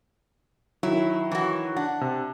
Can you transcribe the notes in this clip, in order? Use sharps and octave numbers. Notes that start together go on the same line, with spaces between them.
D#3 F#3 E4
E3 F#4
D4 F#5
C3